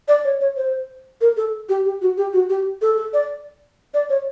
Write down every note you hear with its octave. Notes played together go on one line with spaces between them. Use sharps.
D5
C#5
C#5
C5
A#4
A4
G4
G4
F#4
G4
F#4
G4
A4
A4
D5
D5
C#5